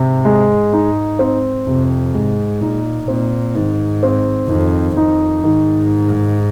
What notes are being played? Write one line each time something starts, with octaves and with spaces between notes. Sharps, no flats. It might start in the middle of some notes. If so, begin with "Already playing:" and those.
Already playing: G#2 C3
G#3
D#4
C4
F2 C3
G#2 G#3
A#2 D#4
A#2 C4
G#2 D#3
C4
F2 D#3
F2 D#4
G#2 D#3